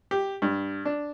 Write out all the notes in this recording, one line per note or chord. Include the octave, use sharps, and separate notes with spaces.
G4
G2
D4